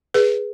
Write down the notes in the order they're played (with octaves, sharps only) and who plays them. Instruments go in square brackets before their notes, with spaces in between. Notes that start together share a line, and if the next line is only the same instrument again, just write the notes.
[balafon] G#4 B4